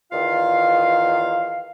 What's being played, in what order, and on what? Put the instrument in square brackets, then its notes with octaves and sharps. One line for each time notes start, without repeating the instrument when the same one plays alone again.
[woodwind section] E2 D#3 F4 F5